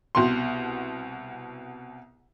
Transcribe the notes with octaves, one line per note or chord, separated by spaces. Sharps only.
C2 B2 C6